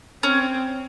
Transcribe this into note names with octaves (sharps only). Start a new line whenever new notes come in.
C4 C#4